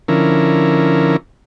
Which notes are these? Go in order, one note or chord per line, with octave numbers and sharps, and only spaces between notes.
D3 F3 C#4 E4 A#4